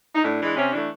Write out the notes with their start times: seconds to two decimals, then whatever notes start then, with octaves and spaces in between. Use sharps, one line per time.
0.15 D#4
0.23 A2 D4
0.39 E3 G#3
0.56 C3 C#4
0.72 E3 A3 D4